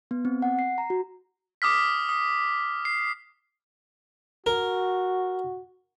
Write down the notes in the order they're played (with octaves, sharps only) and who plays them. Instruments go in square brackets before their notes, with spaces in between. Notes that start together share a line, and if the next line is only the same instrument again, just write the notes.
[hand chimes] B3
C4
F#5
C7
A#5
F#4
[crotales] D6 D#6 F6 B6
D#6
C7
[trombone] F#4 [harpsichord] A#4